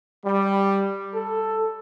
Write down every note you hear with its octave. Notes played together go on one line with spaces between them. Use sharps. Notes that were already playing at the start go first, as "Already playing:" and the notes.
G3
A4